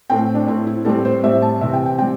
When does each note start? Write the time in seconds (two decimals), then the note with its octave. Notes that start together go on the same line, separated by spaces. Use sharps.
0.10 A2 A3 C4 G5
0.34 D4
0.48 A2 A3 C4 E4
0.67 E4
0.85 A2 G3 C4 A4
1.05 C5
1.24 A2 G3 C4 E5
1.42 A5
1.61 C3 E3 C4 E5
1.73 G5
1.86 G5
1.99 G3 C4 G5